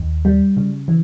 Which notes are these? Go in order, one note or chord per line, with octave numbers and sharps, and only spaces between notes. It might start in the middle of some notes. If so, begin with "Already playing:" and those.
Already playing: D#2
G3
C#3
E3